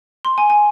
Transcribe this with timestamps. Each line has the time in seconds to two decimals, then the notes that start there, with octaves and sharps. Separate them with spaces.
0.25 C6
0.38 G#5
0.50 G#5